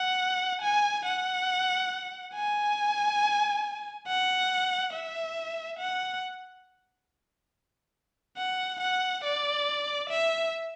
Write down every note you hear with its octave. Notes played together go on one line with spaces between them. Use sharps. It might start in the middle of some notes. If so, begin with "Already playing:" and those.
Already playing: F#5
G#5
F#5
G#5
F#5
E5
F#5
F#5
F#5
D5
E5